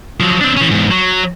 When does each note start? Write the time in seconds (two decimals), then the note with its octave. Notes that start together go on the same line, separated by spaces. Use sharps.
0.20 F3 F#3
0.41 C4 D4
0.57 E3 C#4
0.71 E2 G#2
0.91 F#3